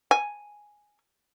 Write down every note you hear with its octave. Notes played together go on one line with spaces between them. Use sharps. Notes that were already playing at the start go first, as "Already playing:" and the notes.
G#5